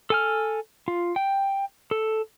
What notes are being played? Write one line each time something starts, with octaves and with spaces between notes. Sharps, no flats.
A4 G#5 F6
F4
G5
A4